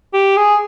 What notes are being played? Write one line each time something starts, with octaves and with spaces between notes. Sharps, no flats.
G4
G#4